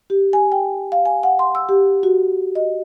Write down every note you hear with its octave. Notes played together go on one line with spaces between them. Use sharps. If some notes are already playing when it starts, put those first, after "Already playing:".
G4
G#5
G5
F5
G#5
F#5
C6
E6
G4
F#4
D#5